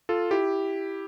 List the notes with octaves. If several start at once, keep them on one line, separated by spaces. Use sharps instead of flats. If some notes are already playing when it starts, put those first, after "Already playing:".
F4 A4
E4 G4